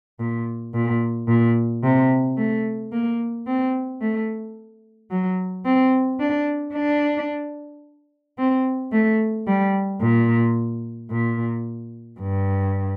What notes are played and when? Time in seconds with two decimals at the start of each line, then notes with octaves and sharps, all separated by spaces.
0.19 A#2
0.74 A#2
1.28 A#2
1.83 C3
2.37 A3
2.92 A#3
3.47 C4
4.01 A3
5.11 F#3
5.65 C4
6.20 D4
6.74 D4
8.38 C4
8.92 A3
9.47 G3
10.01 A#2
11.10 A#2
12.19 G2